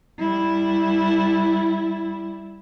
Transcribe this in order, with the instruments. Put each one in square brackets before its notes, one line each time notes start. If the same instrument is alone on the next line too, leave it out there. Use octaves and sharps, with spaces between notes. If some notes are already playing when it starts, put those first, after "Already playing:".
[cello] G3 E4